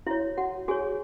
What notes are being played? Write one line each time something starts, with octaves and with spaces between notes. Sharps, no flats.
E4 F#4 C#5 E5
F#4 F#5
F#4 G#4 C#5 G#5